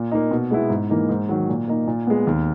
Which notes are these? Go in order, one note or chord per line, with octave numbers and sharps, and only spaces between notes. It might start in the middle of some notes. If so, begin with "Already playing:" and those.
Already playing: A#2
A#3 D#4
B2
G#3 B3 E4
G#2
E3 A#3 D#4
G#2
D#3 F#3
A#2
A#3 D#4
A#2
G#3 B3
D#2